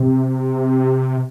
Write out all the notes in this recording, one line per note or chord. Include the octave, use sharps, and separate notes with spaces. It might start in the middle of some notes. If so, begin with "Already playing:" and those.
Already playing: C3